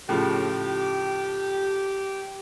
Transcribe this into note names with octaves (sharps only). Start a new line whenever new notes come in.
A2 C#3 F3 G4